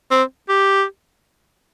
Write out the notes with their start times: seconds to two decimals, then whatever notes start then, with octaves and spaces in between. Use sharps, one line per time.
0.11 C4
0.49 G4